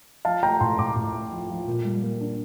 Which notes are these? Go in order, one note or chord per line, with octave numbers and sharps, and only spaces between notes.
F3 F5 A5
A3 G5 A#5
A2 A5 C6
A2 A#5 D6
A2
A3
F3
F3
A#2
G3
A#3
D4